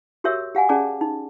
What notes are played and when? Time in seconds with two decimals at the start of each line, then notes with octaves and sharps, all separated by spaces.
0.24 F#4 G4 A#4 C#5 E5 E6
0.55 G4 F5 F#5 G#5
0.69 C#4 G#4 D5 F#5 A5 D6
1.01 D#4